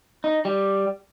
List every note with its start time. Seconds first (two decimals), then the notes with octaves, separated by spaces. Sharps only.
0.24 D#4
0.45 G3